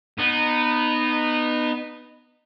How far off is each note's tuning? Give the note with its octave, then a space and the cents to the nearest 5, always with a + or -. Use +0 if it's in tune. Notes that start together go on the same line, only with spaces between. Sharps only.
B3 +0 D#4 -20